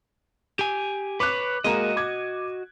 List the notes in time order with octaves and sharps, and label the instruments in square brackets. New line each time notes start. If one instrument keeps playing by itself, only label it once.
[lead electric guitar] G4 G#5
[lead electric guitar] B4 C#5 [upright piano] D6 F#6
[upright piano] G#3 A#3 A#5 [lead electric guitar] F#4 D#5
[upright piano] D6 G#6